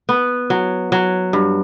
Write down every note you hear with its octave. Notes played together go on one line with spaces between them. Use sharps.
B3
F#3
F#3
G2